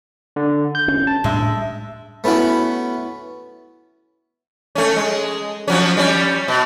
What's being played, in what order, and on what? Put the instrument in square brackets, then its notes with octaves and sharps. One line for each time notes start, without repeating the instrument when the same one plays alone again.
[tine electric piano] D3
G6
[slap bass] C#4
[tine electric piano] A5
[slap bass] A2 G3 D4 [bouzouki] G#3 E5
[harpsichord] A3 B3 C#4 E4 F#4
[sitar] A3 C#4
G#3
F3 F#3 C#4
G3 C#4
B2